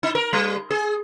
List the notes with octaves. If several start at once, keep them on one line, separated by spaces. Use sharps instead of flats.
D#4
A#4
G3
G#4